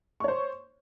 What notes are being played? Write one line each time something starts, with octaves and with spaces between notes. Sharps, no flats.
C5 C#5 C#6